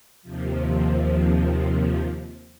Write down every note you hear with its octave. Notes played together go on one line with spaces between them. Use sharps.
D#2 C3 F3